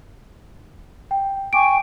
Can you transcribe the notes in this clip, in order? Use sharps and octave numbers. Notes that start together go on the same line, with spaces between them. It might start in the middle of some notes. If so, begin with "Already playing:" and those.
G5
G5 G#5 C#6 D6 D7